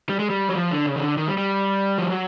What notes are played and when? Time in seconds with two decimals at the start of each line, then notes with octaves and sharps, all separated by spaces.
0.09 G3
0.19 G#3
0.30 G3
0.49 F#3
0.55 F3
0.71 D3
0.86 C#3
0.96 D#3
1.02 D3
1.17 D#3
1.27 G3
1.38 G3
1.98 F3
2.10 F#3